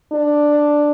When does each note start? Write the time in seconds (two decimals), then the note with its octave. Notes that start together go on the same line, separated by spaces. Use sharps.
0.13 D4